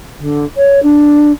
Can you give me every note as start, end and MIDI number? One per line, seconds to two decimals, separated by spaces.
0.19 0.44 50
0.57 0.80 73
0.83 1.32 62